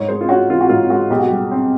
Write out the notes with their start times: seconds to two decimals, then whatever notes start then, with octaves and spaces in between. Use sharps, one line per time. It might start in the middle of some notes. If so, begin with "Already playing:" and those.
Already playing: G#2 C#5
0.08 G#3 C5
0.21 F4
0.29 C#4 F#4
0.49 E3 F4
0.61 F#4
0.69 G#2 F4
0.90 G#3 F#4
1.10 B1 G4
1.20 F#4
1.28 G3 G4
1.51 C4